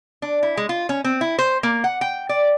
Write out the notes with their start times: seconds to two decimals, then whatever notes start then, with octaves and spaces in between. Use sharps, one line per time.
0.22 D4
0.43 E4
0.57 G#3
0.69 F4
0.89 C#4
1.04 C4
1.21 E4
1.39 C5
1.63 A#3
1.84 F#5
2.01 G5
2.29 D5